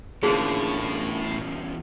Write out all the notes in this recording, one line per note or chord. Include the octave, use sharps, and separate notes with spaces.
E2 A2 D3 F3 A#3 C#4 F#4 G#4